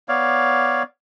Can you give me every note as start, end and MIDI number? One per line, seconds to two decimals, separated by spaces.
0.09 0.83 59
0.09 0.83 73
0.09 0.83 74
0.09 0.83 77